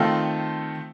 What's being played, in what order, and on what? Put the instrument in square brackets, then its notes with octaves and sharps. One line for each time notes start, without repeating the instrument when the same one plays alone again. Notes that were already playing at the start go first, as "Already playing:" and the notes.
Already playing: [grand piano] D#3 A3 C4 F4 A4